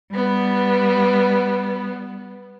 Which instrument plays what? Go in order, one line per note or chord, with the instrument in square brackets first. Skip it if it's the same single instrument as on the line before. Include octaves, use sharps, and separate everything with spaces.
[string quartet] G3 B3